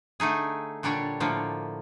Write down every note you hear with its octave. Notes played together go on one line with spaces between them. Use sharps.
D3 A3 D#4 G#4
A#2 D3 G3 D4 C#5
A2 D3 F3 A#3